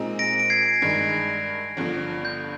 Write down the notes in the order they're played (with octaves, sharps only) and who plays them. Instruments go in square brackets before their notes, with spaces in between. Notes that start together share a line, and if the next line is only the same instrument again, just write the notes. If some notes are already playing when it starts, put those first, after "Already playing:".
Already playing: [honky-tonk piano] A#2 G#3 C4 D#4
[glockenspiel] A#6 D7
D7
G#6 C7
[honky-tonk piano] G2 D#3 G#3 D#4
G1 G2 D3 F3
[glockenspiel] G6